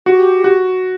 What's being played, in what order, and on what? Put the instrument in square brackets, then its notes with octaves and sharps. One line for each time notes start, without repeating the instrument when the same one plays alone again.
[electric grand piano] F#4 [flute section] G4
[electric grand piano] F#4